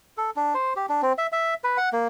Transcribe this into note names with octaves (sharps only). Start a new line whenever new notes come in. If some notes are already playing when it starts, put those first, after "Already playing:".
A4
D4
C5
G4
D4
C4
E5
E5
B4
F#5
A#3